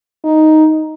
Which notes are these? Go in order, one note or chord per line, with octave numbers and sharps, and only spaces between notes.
D#4